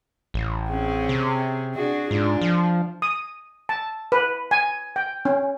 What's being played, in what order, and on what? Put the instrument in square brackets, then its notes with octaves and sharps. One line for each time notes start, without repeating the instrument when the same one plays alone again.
[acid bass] A1
[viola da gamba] C4 C#4 G#4
[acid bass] C3
[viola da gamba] D4 F#4 G#4
[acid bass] G#2 [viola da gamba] D4 F4
[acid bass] F3
[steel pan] D#6
A5
B4
G#5
G5
C#4